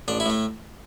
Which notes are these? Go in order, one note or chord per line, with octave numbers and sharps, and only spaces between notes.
A1 D4
E4
A2 A3